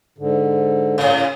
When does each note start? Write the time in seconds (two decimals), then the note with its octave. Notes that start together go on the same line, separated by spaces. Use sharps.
0.18 G#2 D3
0.98 A2 C#3